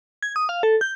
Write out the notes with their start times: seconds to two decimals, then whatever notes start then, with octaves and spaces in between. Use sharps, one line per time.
0.23 G#6
0.36 D#6
0.49 F5
0.63 A4
0.81 G6